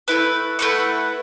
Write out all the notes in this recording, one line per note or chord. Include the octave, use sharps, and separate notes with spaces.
A3 E4 B4
A3 E4 B4 F#5